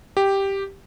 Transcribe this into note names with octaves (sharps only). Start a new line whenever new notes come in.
G4